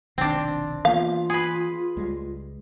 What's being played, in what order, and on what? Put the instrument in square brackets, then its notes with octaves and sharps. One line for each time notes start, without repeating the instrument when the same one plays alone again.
[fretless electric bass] F1 B1 D#3 [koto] C4 D4
[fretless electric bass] E3 A#3 B3 [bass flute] F4 [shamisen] F5
[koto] G#4 B4
[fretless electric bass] C#2 G3 G#3